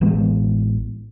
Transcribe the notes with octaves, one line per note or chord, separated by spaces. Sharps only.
A1 E3 G#3 B3